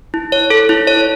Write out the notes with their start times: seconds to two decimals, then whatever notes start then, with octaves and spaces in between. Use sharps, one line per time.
0.14 E4
0.32 C#5
0.50 A4
0.69 E4
0.87 C#5